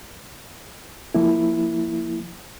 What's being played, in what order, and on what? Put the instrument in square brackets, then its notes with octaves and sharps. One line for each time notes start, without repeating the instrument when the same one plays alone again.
[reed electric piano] F3 A#3 E4